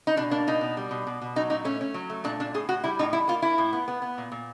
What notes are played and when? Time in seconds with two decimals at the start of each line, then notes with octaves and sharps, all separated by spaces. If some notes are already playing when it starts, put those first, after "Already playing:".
0.07 D#4
0.17 B2 D4
0.31 A#3 D4
0.47 B2 D#4
0.61 B2
0.77 G3
0.91 B2
1.07 B2
1.21 B2
1.36 F#3 D#4
1.50 A#2 D#4
1.65 A3 C#4
1.81 C#4
1.94 F#3
2.10 A3
2.24 A#2 D4
2.40 A#2 D4
2.54 A2 G#4
2.69 A2 F#4
2.84 G3 E4
2.99 A2 D#4
3.13 G3 E4
3.28 A#3 F4
3.42 A#3 E4
3.58 A2
3.73 B3
3.88 B3
4.02 B3
4.18 A#2
4.32 A#2